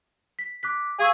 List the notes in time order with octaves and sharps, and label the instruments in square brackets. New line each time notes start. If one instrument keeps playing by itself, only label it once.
[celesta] B6
D6 F#6 B6
[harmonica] G#4 G#5 [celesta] F5 C#6 E6